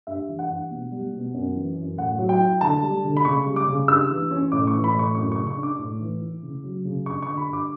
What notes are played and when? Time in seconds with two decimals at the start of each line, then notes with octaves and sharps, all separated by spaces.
0.07 G2 E5
0.28 E3
0.39 F#5
0.49 G2
0.71 B2
0.91 G3
1.13 B2
1.34 F#2
1.56 E3
1.76 F#2
1.98 A2 F#5
2.19 F#3
2.29 G5
2.40 E4
2.61 D3 A5
2.82 G3
3.04 D3
3.17 B5
3.25 C#3 C#6
3.45 G3
3.56 D6
3.67 C#3
3.88 G2 E6
4.10 E3
4.31 C#4
4.52 A2 D6
4.67 C#6
4.73 E3
4.84 B5
4.94 A2 C#6
5.15 F#2 C#6
5.32 C#3 C#6
5.47 C#6
5.57 D4
5.63 D6
5.79 A2
6.00 E3
6.21 E4
6.43 C#3
6.64 F#3
6.85 C#3
7.06 G2 C#6
7.22 D3 C#6
7.37 B5
7.49 G2 D6